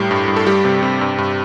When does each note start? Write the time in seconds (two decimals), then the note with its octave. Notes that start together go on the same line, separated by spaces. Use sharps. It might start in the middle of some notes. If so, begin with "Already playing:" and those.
Already playing: A2 G3 G4 A#4
0.11 G2
0.28 G2
0.36 A4
0.47 G3 G4
0.65 C3
0.83 C3
1.01 G2
1.18 G2